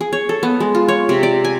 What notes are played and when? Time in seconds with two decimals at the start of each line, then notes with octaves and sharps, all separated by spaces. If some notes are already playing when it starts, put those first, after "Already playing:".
0.01 G#4
0.13 C#5
0.29 A4
0.43 B3
0.60 G#3
0.75 F4
0.88 C#5
1.09 C3
1.23 D5
1.45 G#5